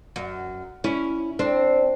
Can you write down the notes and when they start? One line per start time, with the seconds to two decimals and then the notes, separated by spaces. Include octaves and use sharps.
0.16 F#2
0.84 C#4 E4
1.39 C4 D4